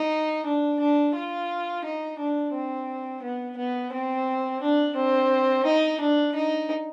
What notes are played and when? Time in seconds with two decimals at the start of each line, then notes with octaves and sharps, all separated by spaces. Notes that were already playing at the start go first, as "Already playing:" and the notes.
Already playing: D#4
0.46 D4
0.80 D4
1.15 F4
1.84 D#4
2.18 D4
2.54 C4
3.22 B3
3.57 B3
3.93 C4
4.62 D4
4.96 C4
5.65 D#4
6.00 D4
6.35 D#4